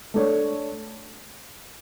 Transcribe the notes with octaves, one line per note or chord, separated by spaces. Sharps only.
A3 D4 A4 C#5